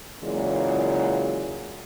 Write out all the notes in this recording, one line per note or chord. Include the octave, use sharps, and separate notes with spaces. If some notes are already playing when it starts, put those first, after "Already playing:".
A#2 C#3 E3 F#3 G#3